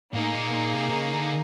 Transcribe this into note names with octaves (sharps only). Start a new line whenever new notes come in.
A2 A#3 D#4 G#4
A#2
B2
A#2
C3
C3
C#3
D3